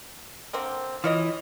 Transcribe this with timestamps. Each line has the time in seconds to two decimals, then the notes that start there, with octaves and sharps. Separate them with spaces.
0.53 D3 A#3 C4
1.04 E3 F4 C#5 D#5